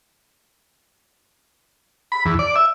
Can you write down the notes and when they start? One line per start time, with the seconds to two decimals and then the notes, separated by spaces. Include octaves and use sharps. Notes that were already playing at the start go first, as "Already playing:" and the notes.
2.12 B5
2.25 E2
2.39 D5
2.56 E5